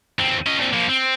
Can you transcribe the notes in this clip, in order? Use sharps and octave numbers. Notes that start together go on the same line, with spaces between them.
D#2 C4
C#4 D#5
A#2 C4
F3 A#3
C4